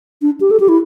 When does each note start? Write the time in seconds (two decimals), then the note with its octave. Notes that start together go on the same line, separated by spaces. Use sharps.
0.22 D4
0.41 G4
0.51 A4
0.60 G4
0.69 E4